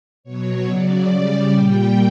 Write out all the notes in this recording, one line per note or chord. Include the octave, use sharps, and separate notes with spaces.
B2 F#3 C#5
C#3 F#3 D5
C#3 G3
A#2 G3 G5